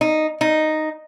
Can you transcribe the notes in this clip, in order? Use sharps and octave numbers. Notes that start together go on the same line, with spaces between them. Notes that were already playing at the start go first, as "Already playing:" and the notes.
D#4
D#4